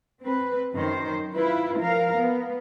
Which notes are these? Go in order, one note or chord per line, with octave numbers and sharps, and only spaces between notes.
C4 B4
F#2 D#3 C5
E4 F4 B4
F3 A#4 F5
B3